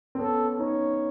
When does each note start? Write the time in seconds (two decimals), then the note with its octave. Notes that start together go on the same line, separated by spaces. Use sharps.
0.15 C4
0.19 B3 C#4 A4
0.59 C#4 D#4 C#5